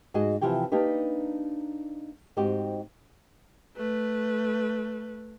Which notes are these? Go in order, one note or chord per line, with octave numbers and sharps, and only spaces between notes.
G#2 F#4 G#4 D#5
C3 E3 F3 G4 G5
A#3 D4 D#4 G4 B4
G#2 C4 D#4 F#4 G4
A3 B4